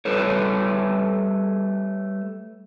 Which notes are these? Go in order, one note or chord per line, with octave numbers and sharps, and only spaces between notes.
G3 A3 A4 B4 C#5